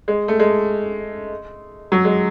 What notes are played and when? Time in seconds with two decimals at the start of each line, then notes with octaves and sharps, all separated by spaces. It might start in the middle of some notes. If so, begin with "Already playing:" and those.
0.08 G#3
0.28 A3
0.40 G#3
1.92 F#3
2.05 G#3